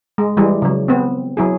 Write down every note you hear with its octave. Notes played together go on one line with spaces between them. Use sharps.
G#3
E3 G3 G#3
C#3 F#3
B3 C4
F#3 E4 G#4